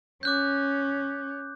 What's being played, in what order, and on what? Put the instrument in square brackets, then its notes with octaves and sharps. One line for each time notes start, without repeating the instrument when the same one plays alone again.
[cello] C#4 [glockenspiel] D6 F#6 G6